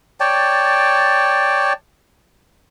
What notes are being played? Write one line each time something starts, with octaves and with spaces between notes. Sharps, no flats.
C#5 D5 G5 A5